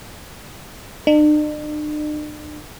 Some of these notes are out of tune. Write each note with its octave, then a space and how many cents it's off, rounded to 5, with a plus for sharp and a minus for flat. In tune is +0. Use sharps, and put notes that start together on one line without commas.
D4 +45